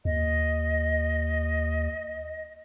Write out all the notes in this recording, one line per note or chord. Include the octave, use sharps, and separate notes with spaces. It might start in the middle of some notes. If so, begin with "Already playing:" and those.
D#2 D#5